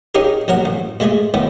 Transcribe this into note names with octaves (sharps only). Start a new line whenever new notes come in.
C#4 D#4 G4 G#4 A#4
A#1 F#3 A#4 F#5
A1
A#2 G#3 A3 G#4
A2 D#3 B3